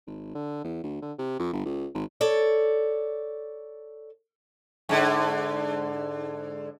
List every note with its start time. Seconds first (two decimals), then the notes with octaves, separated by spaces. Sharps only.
0.07 G#1
0.35 D3
0.64 E2
0.83 D2
1.02 D3
1.19 C3
1.39 F2
1.53 G1
1.65 C#2
1.94 G#1
2.21 A4 C#5 D5
4.89 G#2 D3